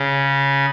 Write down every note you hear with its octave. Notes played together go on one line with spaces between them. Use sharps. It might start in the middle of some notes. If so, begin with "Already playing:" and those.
Already playing: C#3